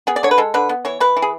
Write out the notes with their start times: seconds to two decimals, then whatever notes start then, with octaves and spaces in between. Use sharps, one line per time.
0.07 B3 G#4
0.16 D5
0.23 D3 C#5
0.31 B4
0.38 G#3 A4
0.54 D3 B4
0.69 B3
0.85 E3 C#5
1.00 E3 B4
1.17 E3
1.22 G#4